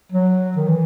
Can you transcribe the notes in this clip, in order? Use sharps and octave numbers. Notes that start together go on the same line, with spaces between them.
F#3
D#3
E3